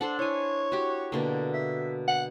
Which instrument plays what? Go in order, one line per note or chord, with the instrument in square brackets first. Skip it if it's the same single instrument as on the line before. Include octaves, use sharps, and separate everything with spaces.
[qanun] D4 A4 C5 [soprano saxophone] F#5
[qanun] E4 G#5 [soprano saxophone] C#5
[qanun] F#4 G4
B2 D3 A#3
[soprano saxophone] E5
F#5